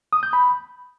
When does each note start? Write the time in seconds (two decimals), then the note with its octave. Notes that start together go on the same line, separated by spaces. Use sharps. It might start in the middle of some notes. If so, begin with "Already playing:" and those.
0.13 D#6
0.23 G6
0.33 B5